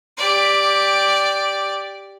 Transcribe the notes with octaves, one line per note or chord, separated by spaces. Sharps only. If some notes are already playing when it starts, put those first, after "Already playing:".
G4 D5